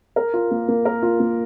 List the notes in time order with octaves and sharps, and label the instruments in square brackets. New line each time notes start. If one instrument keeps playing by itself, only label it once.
[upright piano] A#4
F4
A#3
A#3
A#4
F4
A#3